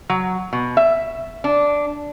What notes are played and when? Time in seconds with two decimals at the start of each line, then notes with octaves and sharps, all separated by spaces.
0.10 F#3
0.53 B2
0.77 E5
1.44 D4